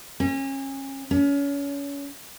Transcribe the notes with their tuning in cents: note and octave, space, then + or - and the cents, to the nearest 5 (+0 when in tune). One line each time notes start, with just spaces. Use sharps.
C#4 -30
C#4 +30